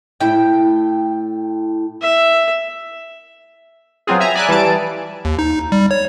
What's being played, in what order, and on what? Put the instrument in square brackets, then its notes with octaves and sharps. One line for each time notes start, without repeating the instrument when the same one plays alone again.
[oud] A2 E4 [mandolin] G5
[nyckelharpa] E5
[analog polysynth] F#3 B3 C4 F4 G#4
E5 G#5 A#5
D5 E5 G#5 B5 F#6
E3 G3 A5 D7
[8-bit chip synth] D#2
D#4
G3
C#5